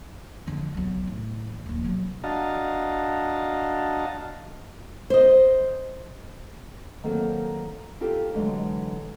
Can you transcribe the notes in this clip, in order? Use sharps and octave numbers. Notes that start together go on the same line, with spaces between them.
F2 D3
B1 F#3
A2
E3
D#1 F3
B2 F#3
D4 F#4 D#5 F5 A5 A#5
C5 D#5
D#3 F#3 A#3 C4 G#4 A4
D#4 F4 G4 A4
D3 E3 F#3 G#3